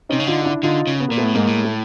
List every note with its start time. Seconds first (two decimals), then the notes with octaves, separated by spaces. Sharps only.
0.09 C3 C#4 D#4
0.20 C#3
0.27 D3 D#4 F4
0.42 F4
0.45 D4 E4
0.63 D3 D#4 F4
0.87 C#3
1.00 B3
1.08 A#2 A#3
1.17 A3 B3
1.23 A2
1.34 G#2 G#3 A#3
1.47 A2
1.64 A3